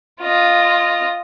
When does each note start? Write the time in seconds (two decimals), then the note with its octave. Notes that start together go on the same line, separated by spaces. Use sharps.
0.22 F4 D#5